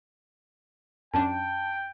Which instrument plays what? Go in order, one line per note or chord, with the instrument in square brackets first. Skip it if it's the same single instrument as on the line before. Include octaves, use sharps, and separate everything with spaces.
[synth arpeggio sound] F#2 C#4 D4 [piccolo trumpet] G5 [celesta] A5